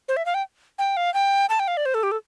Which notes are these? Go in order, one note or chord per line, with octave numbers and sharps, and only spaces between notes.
C5
E5
F5
G5
G5
F5
G5
A5
G5
F5
D5
C5
A4
G4
A4